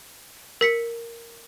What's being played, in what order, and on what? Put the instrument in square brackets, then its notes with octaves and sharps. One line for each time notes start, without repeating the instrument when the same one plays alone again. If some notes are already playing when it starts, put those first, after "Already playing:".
[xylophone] A#4 B6 C#7